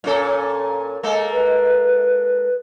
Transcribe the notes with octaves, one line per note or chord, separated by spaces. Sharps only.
A#2 C#4 A4
G#3 A#3 A4
B4